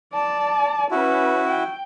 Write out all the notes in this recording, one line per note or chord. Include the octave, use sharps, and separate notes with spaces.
D5 A5
C#4 E4 F#4 B4
G5